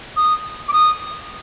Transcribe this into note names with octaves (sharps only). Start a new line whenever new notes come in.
D#6
D6
D#6